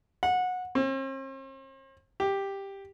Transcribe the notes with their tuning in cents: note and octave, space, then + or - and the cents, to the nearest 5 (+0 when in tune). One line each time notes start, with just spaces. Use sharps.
F#5 -20
C4 +45
G4 +5